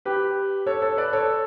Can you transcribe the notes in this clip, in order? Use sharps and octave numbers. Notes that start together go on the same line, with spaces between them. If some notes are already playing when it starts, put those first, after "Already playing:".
G4 B4
A4 C#5
A4 C#5
B4 D5
A4 C#5